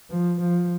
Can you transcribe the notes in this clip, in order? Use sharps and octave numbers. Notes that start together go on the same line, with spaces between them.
F3
F3